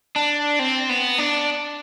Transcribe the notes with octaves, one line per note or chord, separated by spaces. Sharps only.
D4
C4
B3
D4